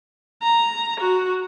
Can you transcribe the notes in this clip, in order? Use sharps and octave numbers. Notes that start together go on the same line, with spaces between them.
A#5
F#4